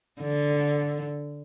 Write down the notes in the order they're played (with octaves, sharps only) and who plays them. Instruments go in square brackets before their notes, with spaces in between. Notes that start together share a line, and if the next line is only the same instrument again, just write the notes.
[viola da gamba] D3